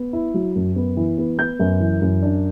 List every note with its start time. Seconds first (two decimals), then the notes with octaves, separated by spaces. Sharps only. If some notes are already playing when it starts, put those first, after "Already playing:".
Already playing: B3
0.13 E4
0.34 F#3
0.56 F#2
0.76 B3
0.97 E3
1.18 B3
1.38 B3 G6
1.60 F#2
1.80 E3
2.02 F#2
2.23 D4